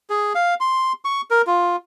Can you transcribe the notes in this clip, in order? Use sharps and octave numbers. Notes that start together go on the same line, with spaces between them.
G#4
F5
C6
C#6
A#4
F4